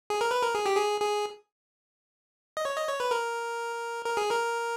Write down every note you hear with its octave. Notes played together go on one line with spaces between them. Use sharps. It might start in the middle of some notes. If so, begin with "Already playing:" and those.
G#4
A#4
B4
A#4
G#4
G4
G#4
G#4
D#5
C#5
D#5
C#5
B4
A#4
A#4
G#4
A#4